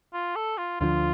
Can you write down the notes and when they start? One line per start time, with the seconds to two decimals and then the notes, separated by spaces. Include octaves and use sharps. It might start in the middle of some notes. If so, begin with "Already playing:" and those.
0.13 F4
0.36 A4
0.58 F4
0.80 D2 D3 F3 F4